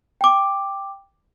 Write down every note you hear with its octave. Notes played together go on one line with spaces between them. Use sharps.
G5 D6